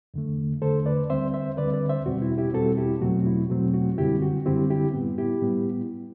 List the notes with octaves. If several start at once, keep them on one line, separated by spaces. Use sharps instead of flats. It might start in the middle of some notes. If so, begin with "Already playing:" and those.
E2 D3 A3
E2 D3 A3 A4 C5
B4 D5
D2 D3 G3 C4 C5 E5
C5 E5
D2 D3 G3 C4 B4 D5
B4 D5
C5 E5
E2 B2 G3 C4 F#4
E4
E4 G4
E2 B2 G3 C4 F#4 A4
E4 G4
E2 B2 F#3 A3 C4 F#4
E4
E2 B2 F#3 A3 C4 F#4
F#4
F#2 D3 G3 C4 E4 G4
F#4
F#2 D3 G3 C4 E4 G4
E4 G4
A2 G3 B3
E4 G4
A2 G3 B3